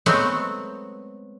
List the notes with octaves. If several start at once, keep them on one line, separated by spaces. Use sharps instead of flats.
F#3 G#3 A3 B3 C4 F#4